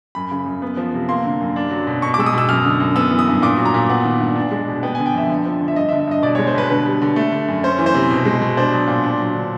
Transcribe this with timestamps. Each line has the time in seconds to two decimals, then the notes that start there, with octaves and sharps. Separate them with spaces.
0.15 F#2 B5
0.31 C#3
0.46 F#2
0.62 B3
0.77 F3
0.94 C3
1.09 A#3 C6
1.24 D3
1.40 F#2
1.56 D4
1.71 F#3
1.87 B2
2.02 B2 C#6
2.14 D6
2.18 G#3 E6
2.26 D#6
2.33 B2 E6
2.49 F#2 F6
2.65 D3
2.80 F#2
2.96 B3 E6
3.11 E3
3.19 D#6
3.27 G2
3.42 A#2 D6
3.58 F#3
3.65 A#5
3.74 A#2
3.89 B3 F#5
4.05 D#3
4.20 G2
4.36 D4
4.51 G#3
4.68 B2
4.83 B3 G5
4.95 G#5
4.99 D3
5.06 G5
5.14 F2 E5
5.29 D3
5.46 F3
5.61 D3
5.68 E5
5.76 G2 D#5
5.89 E5
5.92 D3
6.00 E5
6.07 G2 D#5
6.23 B2 D5
6.35 C#5
6.38 G#3
6.47 C5
6.55 B2 B4
6.70 D3 B4
6.86 G3
7.02 D3
7.16 A3
7.32 D3
7.48 F#2
7.63 C#4 C5
7.79 E3
7.86 C5
7.94 C3
8.11 B2
8.25 G#3
8.42 B2
8.57 D4 C5
8.73 F#3
8.87 A#2
9.04 D4
9.20 F#3
9.35 D3